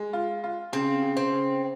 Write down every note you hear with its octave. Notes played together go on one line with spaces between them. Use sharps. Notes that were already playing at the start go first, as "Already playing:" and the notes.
Already playing: G#3
F4
F4
C#3 C4
C#3
C4
C#3